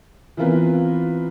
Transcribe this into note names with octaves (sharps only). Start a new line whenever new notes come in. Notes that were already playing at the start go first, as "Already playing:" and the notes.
E3 B3 C4 F4 A#4 B4